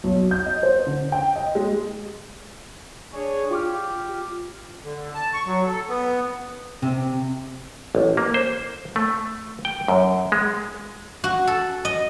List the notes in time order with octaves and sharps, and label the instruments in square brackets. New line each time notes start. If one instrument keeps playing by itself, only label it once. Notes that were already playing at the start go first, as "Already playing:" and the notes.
[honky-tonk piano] B1
G6
D#5
C5
D3
G5
D#5
G#3
[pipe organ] D4 G#4 C#5
[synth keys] F4 D6 F6 [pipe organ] G4
[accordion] D3
A5
C#6
F#3
A4
B3
[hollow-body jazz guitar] C3
[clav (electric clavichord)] A1
A#3
C5
A3
G5
F#2
G#3
[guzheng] F#4
A4
D#5